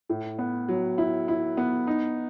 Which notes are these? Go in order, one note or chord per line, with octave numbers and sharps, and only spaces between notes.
A2
B3
F#3
E4
E4
B3
D#4